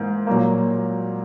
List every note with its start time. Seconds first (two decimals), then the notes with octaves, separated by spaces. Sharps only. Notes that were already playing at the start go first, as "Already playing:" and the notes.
Already playing: G#2 E3 A#3
0.27 A#2 F#3 A#3